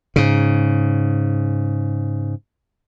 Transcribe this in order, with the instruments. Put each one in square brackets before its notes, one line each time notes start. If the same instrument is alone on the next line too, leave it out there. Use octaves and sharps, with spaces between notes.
[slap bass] G#2 C#3